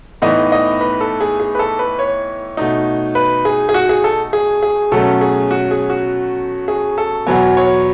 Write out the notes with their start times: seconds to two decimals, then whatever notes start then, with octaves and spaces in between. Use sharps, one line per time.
0.22 A2 E3 B3 D#4 D#5
0.52 D#5
0.81 B4
1.01 A4
1.21 G#4
1.39 G#4
1.55 B4
1.59 A4
1.79 B4
1.99 C#5
2.57 B2 A3 D#4
3.15 B4
3.45 G#4
3.69 G#4
3.74 F#4
3.89 G#4
4.04 A4
4.33 G#4
4.63 G#4
4.92 B2 F#3 A3 C#4 A4
5.21 G#4
5.51 F#4
5.71 G#4
5.90 F#4
6.68 G#4
6.98 A4
7.27 E2 B2 F#3 B3 G#5
7.57 C#5